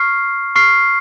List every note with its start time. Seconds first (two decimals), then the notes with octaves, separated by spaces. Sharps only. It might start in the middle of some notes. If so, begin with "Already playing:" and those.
Already playing: C#6 F6 C7
0.56 C#6 F6 C7